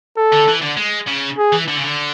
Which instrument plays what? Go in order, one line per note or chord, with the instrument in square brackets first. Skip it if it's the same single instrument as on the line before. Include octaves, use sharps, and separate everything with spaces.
[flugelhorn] A4
[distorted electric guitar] D3
E3
D3
G#3
C#3
[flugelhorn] G#4
[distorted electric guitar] E3
D3
C#3
D3